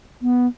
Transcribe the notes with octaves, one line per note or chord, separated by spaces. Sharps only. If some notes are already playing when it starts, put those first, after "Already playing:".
B3